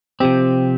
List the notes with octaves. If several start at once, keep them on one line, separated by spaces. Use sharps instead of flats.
C3 F3 C4 G4